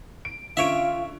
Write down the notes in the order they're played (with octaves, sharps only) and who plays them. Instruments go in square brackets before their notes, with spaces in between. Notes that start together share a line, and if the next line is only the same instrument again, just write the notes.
[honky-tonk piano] D7
[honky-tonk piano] D3 C#4 D7 [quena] F4 [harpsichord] C#5 E5 [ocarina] F5